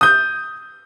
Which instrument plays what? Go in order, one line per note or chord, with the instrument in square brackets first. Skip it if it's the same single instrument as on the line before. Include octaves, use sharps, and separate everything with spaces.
[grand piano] D#6 G6